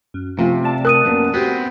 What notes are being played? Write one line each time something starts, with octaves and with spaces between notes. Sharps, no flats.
F#2
C3 F3 A3 C#4 F4
A3 D5 A5
A#4 D#6 F#6 D#7
F#2 A#3 B3
B3 C4 F#4 G4